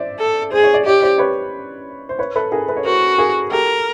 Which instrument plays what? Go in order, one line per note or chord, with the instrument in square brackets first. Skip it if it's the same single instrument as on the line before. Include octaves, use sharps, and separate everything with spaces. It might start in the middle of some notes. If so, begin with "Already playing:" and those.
Already playing: [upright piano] C5 D5 E5
[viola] A4
[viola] G#4 [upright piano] C5
[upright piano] C#5
D5
[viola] G4 [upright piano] C#5 D#5
[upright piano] C5 D5
B4 C#5
C5
B4 C#5
A4 B4
G#4 A#4
A4 B4
C#5
[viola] F#4 [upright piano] A#4 C5
[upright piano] G#4 A#4
[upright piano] G4 A4 [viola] A#4